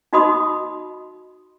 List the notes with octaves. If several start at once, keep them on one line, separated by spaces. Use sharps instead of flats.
D#4 F#4 D#5 B5 C6 D#6